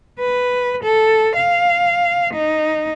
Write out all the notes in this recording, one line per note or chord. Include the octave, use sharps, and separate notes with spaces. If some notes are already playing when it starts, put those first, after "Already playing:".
B4
A4
F5
D#4